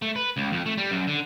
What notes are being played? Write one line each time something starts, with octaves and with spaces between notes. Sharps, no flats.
A3
B4
C#2
F2
A3
G3
F#2
D3